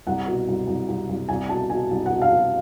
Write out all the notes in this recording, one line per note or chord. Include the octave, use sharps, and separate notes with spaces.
C2 F#5
B2
C2
C2
C2
C2
C2 G#5
B2 A5
B2 G#5
C2
F#5
B2
F5
B2